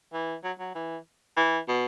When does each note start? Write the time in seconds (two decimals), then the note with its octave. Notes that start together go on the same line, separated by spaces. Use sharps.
0.13 E3
0.44 F#3
0.60 F#3
0.75 E3
1.37 E3
1.68 B2